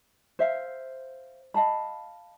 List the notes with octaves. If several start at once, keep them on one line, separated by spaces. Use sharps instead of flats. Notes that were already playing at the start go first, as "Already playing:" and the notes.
C5 E5 F5
D#5 F5 A5 B5